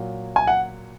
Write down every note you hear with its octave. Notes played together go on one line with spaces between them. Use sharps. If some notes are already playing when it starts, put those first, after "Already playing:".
Already playing: A#2 F#3
G#5
F#5